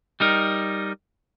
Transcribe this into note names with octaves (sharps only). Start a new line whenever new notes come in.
G3 D#4 A#4